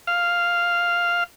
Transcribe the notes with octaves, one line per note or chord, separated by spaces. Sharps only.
F5